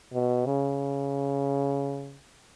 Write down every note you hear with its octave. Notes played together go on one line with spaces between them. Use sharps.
B2
C#3